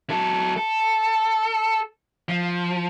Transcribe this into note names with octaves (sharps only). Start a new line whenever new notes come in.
F#3 A4
A4
F3